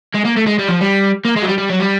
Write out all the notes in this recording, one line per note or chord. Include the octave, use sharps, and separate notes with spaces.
G#3
A#3
A3
G#3
G3
F3
G3
A#3
G#3
F#3
G3
G3
F#3
G3